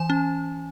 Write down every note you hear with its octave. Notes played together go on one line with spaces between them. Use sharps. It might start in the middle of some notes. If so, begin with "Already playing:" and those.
Already playing: E3 G#5
C#4